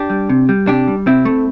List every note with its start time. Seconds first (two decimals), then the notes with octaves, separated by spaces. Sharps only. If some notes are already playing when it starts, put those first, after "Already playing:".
Already playing: D4 G4
0.10 G3
0.29 C3
0.49 G3
0.67 C3 D4 G4
0.88 G3
1.06 C3 C4 E4
1.25 A3